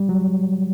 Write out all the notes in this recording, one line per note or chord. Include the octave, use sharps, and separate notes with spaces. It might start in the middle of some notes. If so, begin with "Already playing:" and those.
Already playing: G3
F#3